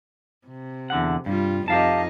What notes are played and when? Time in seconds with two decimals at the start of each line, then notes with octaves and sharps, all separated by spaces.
0.47 C3
0.90 E2 D3 F#5
1.26 G2 G3 F4
1.68 F2 D#4 G4 D#5 F5 A5